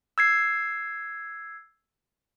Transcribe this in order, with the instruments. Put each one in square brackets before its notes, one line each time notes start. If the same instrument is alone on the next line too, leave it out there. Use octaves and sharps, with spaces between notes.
[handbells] E6 G#6 C7